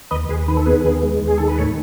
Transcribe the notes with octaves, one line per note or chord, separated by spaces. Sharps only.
D#2 B4 D#5
D#2 G#4 B4
D#3 B4
A4
B3 G#4 B4
D#2
G#3
D#2
G#4
D#3 A4
B4
A2 A4 C#5